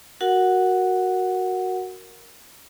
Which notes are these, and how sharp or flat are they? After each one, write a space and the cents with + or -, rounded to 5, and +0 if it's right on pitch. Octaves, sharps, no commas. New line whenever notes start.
F#4 +0 A#4 +0 F#5 +0